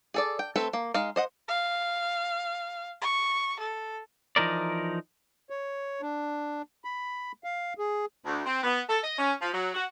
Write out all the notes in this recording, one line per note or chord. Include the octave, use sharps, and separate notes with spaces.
G#4 A4 D5
G5
A3 C4 A4 B4
A#3
G#3 D#4 F5
C5 D#5 F#5
F5
C#6
A4
E3 F3 D#4 A#4 D5
C#5
D4
B5
F5
G#4
D2
C4
B3
A4
D#5
C#4
F3
F#3
F#4